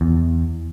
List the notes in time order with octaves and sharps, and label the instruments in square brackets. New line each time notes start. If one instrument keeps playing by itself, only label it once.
[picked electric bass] E2